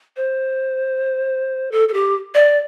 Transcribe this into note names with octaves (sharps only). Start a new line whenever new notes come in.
C5
A4
A4
G4
D5